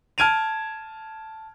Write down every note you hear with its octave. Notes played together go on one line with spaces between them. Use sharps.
A5 F6 G#6 D7 D#7 F7